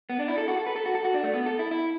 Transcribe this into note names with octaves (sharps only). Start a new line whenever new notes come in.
B3
D4
E4
A4
F#4
A4
B4
A4
F#4
A4
F#4
D4
A3
B3
A4
E4
E4